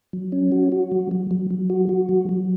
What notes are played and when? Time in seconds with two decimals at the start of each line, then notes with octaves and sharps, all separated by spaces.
0.13 F#3
0.32 C#4
0.52 F#4
0.72 F#4
0.92 F#3
1.11 F#3
1.31 F#3
1.51 F#3
1.70 F#4
1.89 F#4
2.09 F#3
2.29 F#3